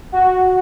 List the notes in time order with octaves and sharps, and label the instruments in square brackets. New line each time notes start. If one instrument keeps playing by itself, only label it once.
[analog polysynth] F#4